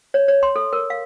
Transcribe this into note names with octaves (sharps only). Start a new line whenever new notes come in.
C#5
C#5
C6
A4
A#4
F5